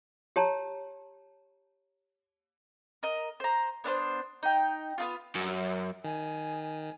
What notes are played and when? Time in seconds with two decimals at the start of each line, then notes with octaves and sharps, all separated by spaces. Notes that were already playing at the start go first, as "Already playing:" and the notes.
0.36 G4 C#5 A5 A#5
3.03 A#4 D#5
3.40 C5 A#5
3.84 B3 D4 A#4 C5
4.43 D#4 G5
4.98 B3 D#4 F4
5.35 F#2
6.04 D#3 G#5